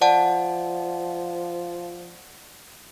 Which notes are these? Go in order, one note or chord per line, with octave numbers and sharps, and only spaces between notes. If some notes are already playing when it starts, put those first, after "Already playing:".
F3 D5 F#5 A5